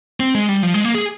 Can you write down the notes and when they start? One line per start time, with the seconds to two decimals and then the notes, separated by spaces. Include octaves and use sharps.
0.20 C4
0.35 G#3
0.49 G3
0.63 F3
0.74 G#3
0.85 A#3
0.95 G#4